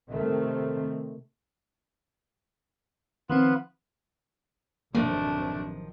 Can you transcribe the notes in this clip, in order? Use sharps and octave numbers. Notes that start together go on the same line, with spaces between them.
C3 D#3 A3 C4
D#3 F3 B3 C4 F4 B4
A1 F#2 C3 D#3 F3 A3 A#3 D4